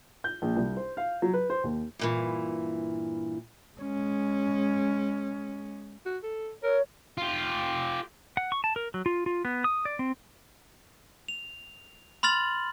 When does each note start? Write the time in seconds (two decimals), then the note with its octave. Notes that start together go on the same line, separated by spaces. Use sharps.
0.24 G6
0.42 A#1
0.56 C2
0.77 C5
0.97 F5
1.22 F#3
1.34 B4
1.50 C5
1.64 D#2
1.99 G2 A#2 E3
3.79 G#3 C#4
6.05 F#4
6.23 A4
6.63 A#4 C#5
7.18 F4 G4
8.37 F#5
8.52 C#6
8.64 A5
8.76 A#4
8.94 F#3
9.06 F4
9.26 F4
9.45 B3
9.64 D#6
9.85 D5
9.99 C4
11.28 F7
12.23 B5 C6 F6 A6 F#7